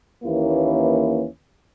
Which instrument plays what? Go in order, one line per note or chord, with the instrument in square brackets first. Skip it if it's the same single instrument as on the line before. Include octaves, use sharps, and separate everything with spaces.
[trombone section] D#2 E3 A#3 C#4 E4 B4